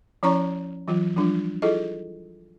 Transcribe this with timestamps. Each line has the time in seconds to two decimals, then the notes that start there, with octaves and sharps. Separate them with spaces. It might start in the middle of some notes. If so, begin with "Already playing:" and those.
0.23 F3 C#4 E4 C#5 A#5 C#6
0.88 E3 F#3 F4
1.16 F3 G3 D4 F4
1.62 E4 F4 G#4 A4 D#5